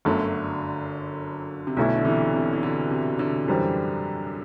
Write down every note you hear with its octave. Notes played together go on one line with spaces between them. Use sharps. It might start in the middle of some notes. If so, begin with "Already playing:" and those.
G1 F#2 D3 F#3 A3 D4
C3
B1 B2 D3 A3 E4
D3
C3 E3
C3
E3
D3
C3
D3
F#2 E3 G3 C4